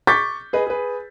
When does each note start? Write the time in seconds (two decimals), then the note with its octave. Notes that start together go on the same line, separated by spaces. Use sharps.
0.07 C#6 D6 G6 A6 B6
0.53 G#4 B4 D#5
0.67 G#4 B4